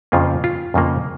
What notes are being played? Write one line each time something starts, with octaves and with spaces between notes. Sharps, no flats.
F2 C#3 F3 A#3 F4
F4
F2 C#3 F3 A#3